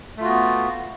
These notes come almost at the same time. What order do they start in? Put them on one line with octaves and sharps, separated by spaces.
A3 F4 F#4 B3